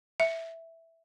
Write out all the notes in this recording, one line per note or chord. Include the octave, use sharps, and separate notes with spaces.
E5